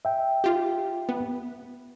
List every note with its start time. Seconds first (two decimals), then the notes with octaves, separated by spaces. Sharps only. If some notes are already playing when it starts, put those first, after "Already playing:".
0.05 E5 G5
0.44 F4 G4
1.09 B3